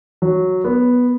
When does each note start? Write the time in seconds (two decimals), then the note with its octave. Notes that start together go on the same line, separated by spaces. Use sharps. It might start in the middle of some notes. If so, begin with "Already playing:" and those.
0.22 F#3
0.64 B3